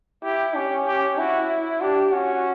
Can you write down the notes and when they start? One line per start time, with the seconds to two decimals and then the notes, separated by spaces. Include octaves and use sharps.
0.23 E4 G4
0.54 C#4 G4
0.87 G4
1.17 E4 F#4
1.81 D4 G4
2.12 C#4 F#4